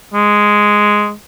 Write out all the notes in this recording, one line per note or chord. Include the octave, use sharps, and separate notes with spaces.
G#3